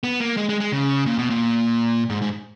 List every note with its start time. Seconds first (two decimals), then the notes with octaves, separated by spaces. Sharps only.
0.04 B3
0.20 A#3
0.37 G#3
0.49 G#3
0.60 G#3
0.72 C#3
1.06 A#2
1.18 B2
1.30 A#2
2.10 G#2
2.22 G#2